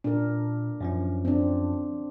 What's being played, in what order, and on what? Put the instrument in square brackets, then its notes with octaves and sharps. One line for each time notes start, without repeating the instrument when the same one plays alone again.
[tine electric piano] A#2 [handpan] D4 A#4
[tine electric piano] F#2 F3 C#4
[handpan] C4 D4